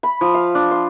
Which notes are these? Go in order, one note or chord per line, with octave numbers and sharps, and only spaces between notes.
B5
F3
F5
D4
C6